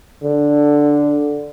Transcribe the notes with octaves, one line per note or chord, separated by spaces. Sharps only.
D3